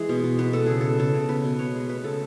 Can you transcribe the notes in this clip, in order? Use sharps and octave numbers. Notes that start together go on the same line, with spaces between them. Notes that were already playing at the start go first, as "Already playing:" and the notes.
Already playing: E3 G#3 G#4
B2
B2
B3 B4
B2 A4
C#3 G#4
B3 A4
C#3 A4
C#3
B3 B4
B2
B3 C#5
G#3
A3 B4
C#3 A4